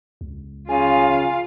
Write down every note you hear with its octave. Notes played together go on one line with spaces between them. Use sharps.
C#2
C#3 F4 F5 G#5